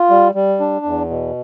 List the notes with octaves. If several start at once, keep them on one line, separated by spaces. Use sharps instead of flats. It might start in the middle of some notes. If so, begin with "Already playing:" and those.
Already playing: F4
G3
G3
D4
E2
B2